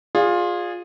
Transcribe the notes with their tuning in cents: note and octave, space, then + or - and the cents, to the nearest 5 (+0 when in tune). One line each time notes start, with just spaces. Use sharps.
F4 +15 G#4 -15 D5 +0